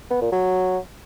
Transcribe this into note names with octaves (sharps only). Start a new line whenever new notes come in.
B3
A#2
F#3